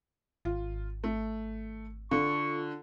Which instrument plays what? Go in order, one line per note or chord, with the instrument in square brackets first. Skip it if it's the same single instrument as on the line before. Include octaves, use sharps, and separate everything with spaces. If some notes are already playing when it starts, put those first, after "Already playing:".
[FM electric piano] G#1 [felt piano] F4
[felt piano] A3
[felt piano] D3 [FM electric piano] F4 A4 [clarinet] C#6